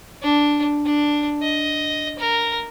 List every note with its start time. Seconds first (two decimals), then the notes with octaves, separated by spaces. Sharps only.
0.23 D4
0.85 D4
1.42 D#5
2.19 A#4